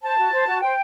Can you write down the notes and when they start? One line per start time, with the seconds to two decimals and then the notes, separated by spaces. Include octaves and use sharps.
0.02 C5 A5
0.17 F#4
0.33 C5
0.47 F#4
0.61 C5 G5